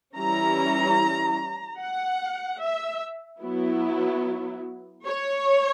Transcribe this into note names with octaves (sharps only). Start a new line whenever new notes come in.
E3 G3 C#4 E4 A#5
F#5
E5
F#3 B3 E4
C#5